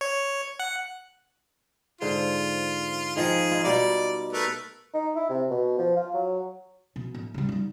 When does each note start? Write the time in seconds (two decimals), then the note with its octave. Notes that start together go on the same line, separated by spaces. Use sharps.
0.01 C#5
0.59 F#5
2.01 G#2 D3 F4 C5
3.17 D#3 F3 G#4
3.51 D#4 F4
3.64 B2 G3 D#4 D5
4.33 A3 A#4 B4
4.94 D#4
5.16 E4
5.29 C3
5.50 B2
5.78 F3
5.96 F4
6.14 F#3
6.96 B2
7.14 A2
7.34 C#3 G3
7.49 G3 D#4